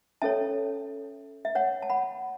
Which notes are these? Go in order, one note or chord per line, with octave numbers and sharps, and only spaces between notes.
C#4 A4 C#5 E5 A5
E5
C#5 F#5
A5
F#5 B5